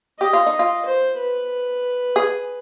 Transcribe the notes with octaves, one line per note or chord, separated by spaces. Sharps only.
G4 D#5
F4
D#4
F4
C5
B4
G#4